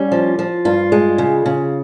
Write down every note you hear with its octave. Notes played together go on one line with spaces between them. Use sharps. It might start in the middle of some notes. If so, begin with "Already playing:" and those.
Already playing: G3 C#4
F3
F3
G2 F4
G#3
C#3
C#3